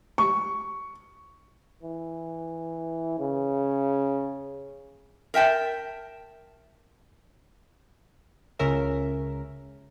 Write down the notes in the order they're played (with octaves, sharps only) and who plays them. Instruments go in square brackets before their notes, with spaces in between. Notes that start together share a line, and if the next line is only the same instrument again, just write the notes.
[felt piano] C#6
[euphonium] E3
C#3
[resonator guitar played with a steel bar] A#4 E5 G5 A5
[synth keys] C#2 C#3 C#4 A#4 E5